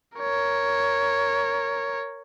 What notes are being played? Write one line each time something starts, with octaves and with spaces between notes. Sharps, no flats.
A#4 C#5